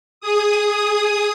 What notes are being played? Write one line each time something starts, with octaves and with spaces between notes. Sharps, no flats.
G#4 D#6